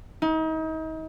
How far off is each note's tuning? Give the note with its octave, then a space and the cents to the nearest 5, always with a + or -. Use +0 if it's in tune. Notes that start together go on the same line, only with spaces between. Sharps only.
D#4 +35